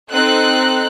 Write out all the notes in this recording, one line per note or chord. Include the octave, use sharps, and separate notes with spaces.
C4 D#4 A4 F#6